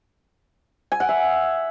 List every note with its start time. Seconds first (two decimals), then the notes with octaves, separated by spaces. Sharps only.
0.92 G#5
1.00 F#5
1.09 E5